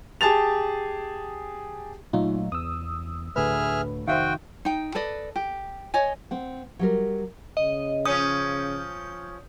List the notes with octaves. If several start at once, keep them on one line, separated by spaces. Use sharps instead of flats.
G4 G#4 A5 A6 F7
A#2 F#3 A3 D#4 F4
E2 D#6 E6
D2 A2 D3 G#4 B4 E5 F6
F1 B1 D#3 F#4 C5 E5 F5 G5
D#4 G5
A4 B4 D5 D#5
G4
C#5 D#5 G#5
C4 F#5
F#3 G3 A#4
C#3 D#5
F3 C#4 D#6 G6